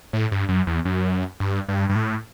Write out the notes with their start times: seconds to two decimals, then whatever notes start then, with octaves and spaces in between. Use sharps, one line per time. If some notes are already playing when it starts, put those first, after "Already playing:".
0.13 A2
0.32 G2
0.49 F#2
0.67 E2
0.85 F#2
1.40 G2
1.69 G2
1.90 G2
1.96 A2